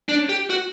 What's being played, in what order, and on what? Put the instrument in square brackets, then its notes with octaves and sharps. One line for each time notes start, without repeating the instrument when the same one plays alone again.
[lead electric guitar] D4
G4
F#4